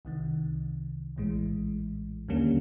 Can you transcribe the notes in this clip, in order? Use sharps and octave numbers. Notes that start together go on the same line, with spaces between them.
C2 C3 D#3
A#1 A2 E3 G#3
D#2 D3 G3 A#3 C#4